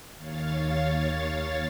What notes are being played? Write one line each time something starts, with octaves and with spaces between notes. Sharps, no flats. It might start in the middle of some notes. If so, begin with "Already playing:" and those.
D#2 C#5 F5 A6